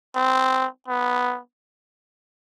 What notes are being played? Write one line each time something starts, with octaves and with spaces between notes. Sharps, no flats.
C4
B3